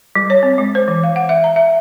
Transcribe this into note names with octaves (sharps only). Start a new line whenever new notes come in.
G3
C#5
C4
G#3
C5
E3
F5
F#5
E5
A#5
E5